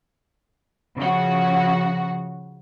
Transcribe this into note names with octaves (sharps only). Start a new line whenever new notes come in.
C#3 F3 F#4